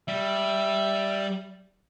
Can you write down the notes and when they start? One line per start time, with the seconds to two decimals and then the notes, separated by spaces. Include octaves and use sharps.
0.08 G3 E5